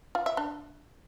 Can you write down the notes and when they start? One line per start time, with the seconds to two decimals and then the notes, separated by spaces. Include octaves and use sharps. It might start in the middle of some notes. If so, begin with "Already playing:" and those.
0.15 F4
0.26 E5
0.37 D4